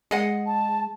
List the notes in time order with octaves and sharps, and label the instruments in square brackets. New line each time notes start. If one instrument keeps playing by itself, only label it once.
[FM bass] G#3 [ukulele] G#4 D#5 F#5
[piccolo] A5